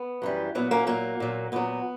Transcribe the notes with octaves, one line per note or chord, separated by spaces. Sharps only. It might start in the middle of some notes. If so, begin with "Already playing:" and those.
Already playing: B3
F#2 E3 G3
A#2 F#3 B3
A#3 C#4
A#2 F#3 A#3
A#2 F#3
A#2 F#3 B3